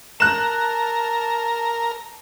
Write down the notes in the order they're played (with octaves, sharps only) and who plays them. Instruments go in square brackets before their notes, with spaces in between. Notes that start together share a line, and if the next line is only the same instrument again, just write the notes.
[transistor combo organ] A#4 [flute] A5 [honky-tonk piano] F#6 E7